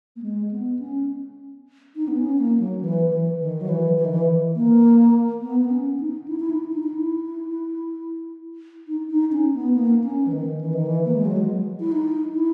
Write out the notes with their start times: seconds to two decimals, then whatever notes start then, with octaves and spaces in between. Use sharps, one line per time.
0.16 A#3
0.22 G#3
0.51 B3
0.79 C#4
1.96 D#4
2.08 B3
2.17 C#4
2.39 A#3
2.59 F#3
2.81 E3
3.10 E3
3.40 D#3
3.61 F#3
3.69 E3
3.97 E3
4.05 D#3
4.12 E3
4.56 A#3
5.42 B3
5.60 B3
5.70 C#4
6.00 D#4
6.28 E4
6.40 E4
6.50 D#4
6.72 D#4
6.83 D#4
6.94 E4
8.88 D#4
9.10 D#4
9.32 C#4
9.54 B3
9.74 A#3
10.04 C#4
10.27 E3
10.32 D#3
10.61 E3
10.74 D#3
10.87 E3
11.05 A#3
11.15 G#3
11.25 F#3
11.37 G#3
11.80 E4
11.92 D#4
12.34 E4